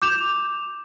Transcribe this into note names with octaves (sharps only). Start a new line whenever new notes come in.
D6 G6 E7 F7